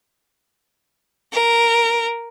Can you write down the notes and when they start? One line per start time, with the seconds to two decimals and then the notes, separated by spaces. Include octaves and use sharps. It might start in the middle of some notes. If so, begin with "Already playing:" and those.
1.32 A#4